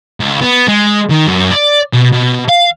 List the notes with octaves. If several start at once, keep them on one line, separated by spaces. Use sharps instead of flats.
C#2
B3
G#3
D#3
F#2
D5
B2
B2
F5